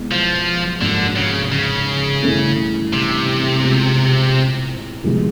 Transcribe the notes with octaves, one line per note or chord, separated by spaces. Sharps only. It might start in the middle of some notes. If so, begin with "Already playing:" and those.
Already playing: B2 G#3 B3 E4
F3
G#2 D3 F3 A#3 D4 F#4
C#3
C#3
G2 E3 A3 C#4
C3
B2 G#3 C4 F4
D2 C3 F3 G#3 B3